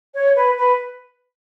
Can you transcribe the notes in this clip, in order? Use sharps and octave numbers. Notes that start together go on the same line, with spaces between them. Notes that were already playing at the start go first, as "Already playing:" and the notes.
C#5
B4
B4